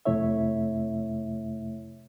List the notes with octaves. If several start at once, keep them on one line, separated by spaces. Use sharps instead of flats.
F2 C3 A3 E4 C#5 E5